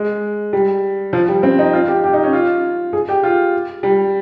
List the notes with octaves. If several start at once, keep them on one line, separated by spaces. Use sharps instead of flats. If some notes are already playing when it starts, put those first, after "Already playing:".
Already playing: G#3
G3
F3
G3
C4
D#4
F4
F4
G4
G4
D#4
C#4
F4
G#4
G4
F4
G3